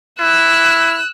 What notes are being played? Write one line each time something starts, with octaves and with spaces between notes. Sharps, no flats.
E4 E6 F#6